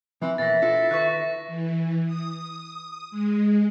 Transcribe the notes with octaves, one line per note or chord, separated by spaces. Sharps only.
E3 F3 C4 B5
E2 B2 E3 A#3 E5 A6 A#6
D4 E4 F4 A4
D#3 E4 B4 C#6 F#6
E3
D#6
G#3